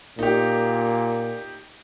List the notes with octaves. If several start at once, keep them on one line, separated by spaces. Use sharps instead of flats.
A#2 D#4 G4